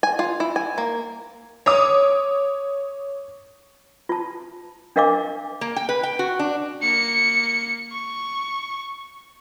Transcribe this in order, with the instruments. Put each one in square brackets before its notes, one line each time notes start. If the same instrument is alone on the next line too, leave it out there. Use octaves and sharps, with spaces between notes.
[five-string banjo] G#5
F4
E4
G#5
A#3
[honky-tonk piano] C#5 D6 D#6
[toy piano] F4 A5
D4 A#4 D#5 F5 G#5 D6
[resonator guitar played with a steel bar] A#3
G5
B4
G5
F#4
D4
[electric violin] A#3 C#7
C#6